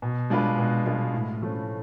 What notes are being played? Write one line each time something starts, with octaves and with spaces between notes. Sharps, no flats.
B2
G#3 D4 F4 B4
B2
G#3 D4 F4 B4
A2
F3 A3 C#4